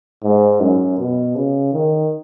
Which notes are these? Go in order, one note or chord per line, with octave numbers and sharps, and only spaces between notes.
G#2
F#2
B2
C#3
D#3